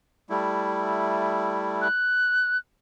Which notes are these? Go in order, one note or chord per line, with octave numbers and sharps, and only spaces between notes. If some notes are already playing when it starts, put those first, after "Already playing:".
G3 A3 E4
F#6